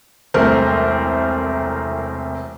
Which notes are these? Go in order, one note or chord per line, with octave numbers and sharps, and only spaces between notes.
E1 C2 A3 A#4 C5